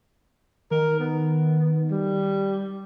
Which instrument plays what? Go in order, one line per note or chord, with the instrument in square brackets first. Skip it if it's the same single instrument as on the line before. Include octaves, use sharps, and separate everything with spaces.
[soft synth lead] D#3 [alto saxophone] A#4
[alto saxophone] B3
G3